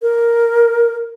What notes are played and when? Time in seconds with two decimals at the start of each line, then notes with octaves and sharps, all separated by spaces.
0.02 A#4